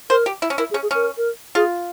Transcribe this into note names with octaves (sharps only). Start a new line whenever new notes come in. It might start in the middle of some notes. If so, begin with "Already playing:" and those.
A#4 C5
G4
E4
C#4
E4 A#4
G#4
C#4
G#4
C#4 A#4
A#4
F4 G#4